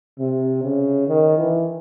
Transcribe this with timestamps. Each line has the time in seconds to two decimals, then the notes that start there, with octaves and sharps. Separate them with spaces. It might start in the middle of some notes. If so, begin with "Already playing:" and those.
0.20 C3
0.64 C#3
1.08 D#3
1.37 E3